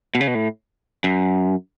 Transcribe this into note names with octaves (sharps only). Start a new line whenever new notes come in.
B2
C#3
B2
A2
F#2